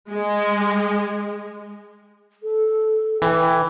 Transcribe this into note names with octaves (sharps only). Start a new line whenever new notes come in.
G#3
A4
E3 G5